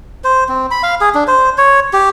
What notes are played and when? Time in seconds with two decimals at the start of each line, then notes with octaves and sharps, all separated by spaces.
0.24 C5
0.48 C4
0.71 B5
0.83 F5
1.01 G#4
1.15 D4
1.27 C5
1.58 C#5
1.93 G4